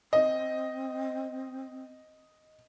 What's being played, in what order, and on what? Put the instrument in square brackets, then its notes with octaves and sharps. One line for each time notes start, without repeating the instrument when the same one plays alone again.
[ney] C4 [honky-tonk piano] D#5